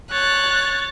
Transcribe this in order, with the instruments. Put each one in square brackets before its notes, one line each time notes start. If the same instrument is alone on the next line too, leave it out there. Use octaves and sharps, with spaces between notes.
[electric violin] C#5 A6 [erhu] F#6